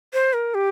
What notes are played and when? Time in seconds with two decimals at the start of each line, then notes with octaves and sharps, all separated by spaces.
0.13 C5
0.33 A#4
0.54 G4